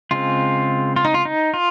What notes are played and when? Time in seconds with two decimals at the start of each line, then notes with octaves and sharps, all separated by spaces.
0.11 C#3 G#3 C4 F4
0.96 F4
1.05 D#4
1.14 F4
1.25 D#4
1.54 F4